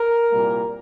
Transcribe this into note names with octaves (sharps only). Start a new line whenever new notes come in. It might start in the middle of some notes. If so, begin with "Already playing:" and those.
Already playing: A#4
C2 A#2 G3 A#3